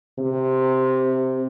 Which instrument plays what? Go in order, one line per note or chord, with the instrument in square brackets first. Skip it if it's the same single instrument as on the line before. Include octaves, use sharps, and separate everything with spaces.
[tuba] C3